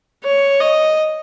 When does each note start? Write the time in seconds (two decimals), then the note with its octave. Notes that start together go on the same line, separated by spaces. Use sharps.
0.24 C#5
0.60 D#5